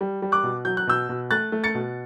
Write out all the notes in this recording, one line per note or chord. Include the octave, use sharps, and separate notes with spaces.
G3
G3
D6 F#6
B2
F#3 G6
F#6
B2 E6 G6
B2
A3 F#6 A6
A3
A6 C#7
B2